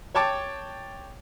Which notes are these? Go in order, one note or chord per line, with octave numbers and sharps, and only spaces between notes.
C#5 G5 A5 D6